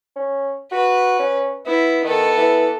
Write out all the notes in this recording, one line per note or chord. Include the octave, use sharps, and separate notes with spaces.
C#4
F#4 B4
C#4
B3 E4
D#3 B3 A4
E3